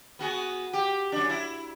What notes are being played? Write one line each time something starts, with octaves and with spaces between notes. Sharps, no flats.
B3 F#4 G#4
G4
F#2 D4
E4